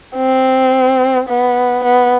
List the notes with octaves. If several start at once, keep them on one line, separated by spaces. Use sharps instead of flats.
C4
B3
B3